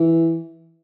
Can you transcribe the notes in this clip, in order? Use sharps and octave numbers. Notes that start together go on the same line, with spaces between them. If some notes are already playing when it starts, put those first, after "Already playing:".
Already playing: E3